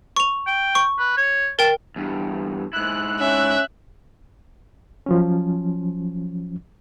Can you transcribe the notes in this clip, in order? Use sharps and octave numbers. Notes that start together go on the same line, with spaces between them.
C#6 F7
G5
C#6
B4
C#5
A#4 G5 A5
E2 G2
G#2 E4 F#6
C#4 E5
F3 F#3 C#4